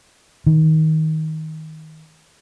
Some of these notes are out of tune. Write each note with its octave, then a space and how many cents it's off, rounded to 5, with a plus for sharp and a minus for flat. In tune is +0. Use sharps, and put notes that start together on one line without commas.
D#3 +20